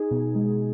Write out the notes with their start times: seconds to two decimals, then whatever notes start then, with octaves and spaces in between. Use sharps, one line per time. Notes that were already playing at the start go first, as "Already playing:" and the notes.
Already playing: D#4 G#4
0.11 B2
0.35 G#3